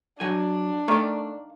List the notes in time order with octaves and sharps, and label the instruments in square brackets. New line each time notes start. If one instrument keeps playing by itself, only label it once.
[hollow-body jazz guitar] F#3 G#5 [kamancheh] D4
[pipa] D#3 A#3 [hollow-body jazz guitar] A3 D5